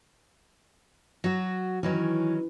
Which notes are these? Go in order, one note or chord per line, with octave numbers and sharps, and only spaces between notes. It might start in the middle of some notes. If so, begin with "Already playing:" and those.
F#3 F#4
D#3 E3 F#3 C#4